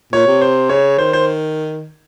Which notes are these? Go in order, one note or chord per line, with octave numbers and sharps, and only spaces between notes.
A#2 C#5
C3
C5
C#3 C#5
D#3 C5
C5